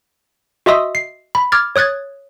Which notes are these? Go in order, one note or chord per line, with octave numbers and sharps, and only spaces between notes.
F#4 D#5 E5 C6 D#6 E6
C7
B5
D6 F6 G#6 A6
C#5 D#6 F#6 G#6 A6